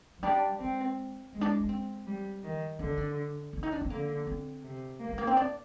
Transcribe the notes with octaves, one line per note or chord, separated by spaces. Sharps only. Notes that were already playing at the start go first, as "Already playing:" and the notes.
F3
G3 D4
G#3 C4
G#3 A#3
D4
D4
C4
G3
D#3
D3 D#4
D#4
D4
D4
D#4
D4
C4
D3 A#3
C4
C3
A#3
G#3
A#3
C4
D4